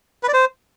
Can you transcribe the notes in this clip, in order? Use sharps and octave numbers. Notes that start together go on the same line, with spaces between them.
B4
D5
C5